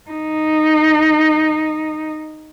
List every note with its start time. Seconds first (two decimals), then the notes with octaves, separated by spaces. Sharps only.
0.11 D#4